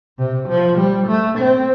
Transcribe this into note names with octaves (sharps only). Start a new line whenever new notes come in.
C3
F3
G3
A3
C4